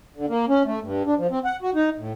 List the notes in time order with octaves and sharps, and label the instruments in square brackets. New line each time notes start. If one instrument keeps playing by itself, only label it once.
[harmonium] D3
A#3
C#4
A3
G2
D4
F3
C4
F#5
F#4
D#4
A2